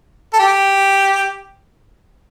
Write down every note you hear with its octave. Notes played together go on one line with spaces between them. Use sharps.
A4
G4